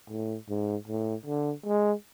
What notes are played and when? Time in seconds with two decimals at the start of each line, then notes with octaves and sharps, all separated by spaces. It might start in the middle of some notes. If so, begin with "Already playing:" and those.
0.10 A2
0.49 G#2
0.88 A2
1.26 D3
1.66 G#3